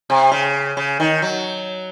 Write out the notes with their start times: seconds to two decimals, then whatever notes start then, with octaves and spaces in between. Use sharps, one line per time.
0.10 C3
0.32 C#3
0.77 C#3
1.00 D#3
1.22 F#3